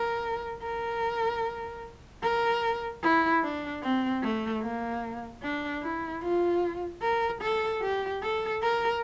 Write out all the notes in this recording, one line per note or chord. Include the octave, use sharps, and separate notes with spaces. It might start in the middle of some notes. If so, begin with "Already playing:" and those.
Already playing: A#4
A#4
A#4
E4
D4
C4
A3
A#3
D4
E4
F4
A#4
A4
G4
A4
A#4